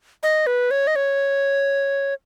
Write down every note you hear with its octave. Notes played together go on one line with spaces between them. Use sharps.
D#5
B4
C#5
D#5
C#5